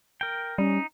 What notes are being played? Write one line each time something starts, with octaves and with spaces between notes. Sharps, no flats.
A#4 G5
G3 C#4 D#4